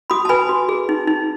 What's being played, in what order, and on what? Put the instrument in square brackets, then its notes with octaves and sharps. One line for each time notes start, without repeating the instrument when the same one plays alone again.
[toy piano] F#4 B5 D#6
A5
B4 G#5 B5
F#4
G#4
D#4
D#4